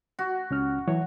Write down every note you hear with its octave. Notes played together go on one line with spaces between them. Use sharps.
F#4
C#2 C#4 F6
E3 F#3 C#5